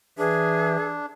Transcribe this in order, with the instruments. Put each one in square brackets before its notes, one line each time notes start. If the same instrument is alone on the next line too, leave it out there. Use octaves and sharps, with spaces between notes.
[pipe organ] E3 B4 E5 [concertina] D4 [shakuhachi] G#4